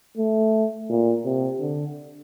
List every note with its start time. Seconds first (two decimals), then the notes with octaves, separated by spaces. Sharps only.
0.17 A3
0.89 A#2
1.25 C3
1.60 D3